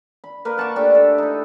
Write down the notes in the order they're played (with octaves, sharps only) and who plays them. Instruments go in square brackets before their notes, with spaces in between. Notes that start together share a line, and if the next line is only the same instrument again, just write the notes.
[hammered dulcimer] B5
A#3 A#4 B4
F#5 A5 C#6 D6
A3 D4 G4 G5
A4
D#4 E4